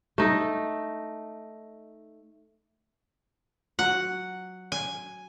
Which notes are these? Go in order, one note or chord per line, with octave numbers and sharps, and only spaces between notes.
A3 D#4
F#3 F#5
G#5